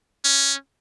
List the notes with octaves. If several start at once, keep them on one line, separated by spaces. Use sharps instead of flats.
C#4